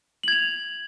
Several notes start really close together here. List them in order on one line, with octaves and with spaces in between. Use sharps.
F#7 G#6 F7